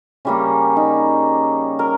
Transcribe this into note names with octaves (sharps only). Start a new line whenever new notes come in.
C#3 G3 A#3 C#4
D#4
A#4